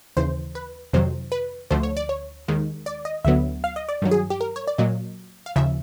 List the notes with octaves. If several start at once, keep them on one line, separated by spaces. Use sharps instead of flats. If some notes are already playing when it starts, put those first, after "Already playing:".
D#2 C#3 E3 C5
B4
F2 C3 D#3 F#3 C5
B4
D2 D3 F3 A3 C5
C#5
D5
C#5
D#2 D#3 G#3
D5
D#5
D2 D3 F#3 B3 E5
F5
D#5
D5
G2 D#3 F#3
G#4
G4
A#4
C#5
D5
A#2 F#3 A#3 D#5
F5
D#2 C#3 F3 E5